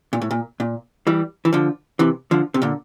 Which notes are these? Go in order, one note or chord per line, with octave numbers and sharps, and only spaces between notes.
A#2
A2
A#2
A#2
E3 G3
E3
D3 F3
C3 E3
D3 F3
C3
A#2 D3